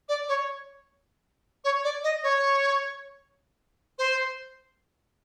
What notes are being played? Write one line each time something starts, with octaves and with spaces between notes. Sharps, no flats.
D5
C#5
C#5
D5
D#5
C#5
C5